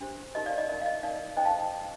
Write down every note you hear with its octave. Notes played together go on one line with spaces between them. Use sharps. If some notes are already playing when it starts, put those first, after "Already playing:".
D4 G4 C5
D#4 G4 A#4 D#5
D5 F5
D#5
D#4 A#4 D#5
F5
D#5
D#4 A#4 D5 F5
D#4 A4 C5 D#5 G5
F5 A5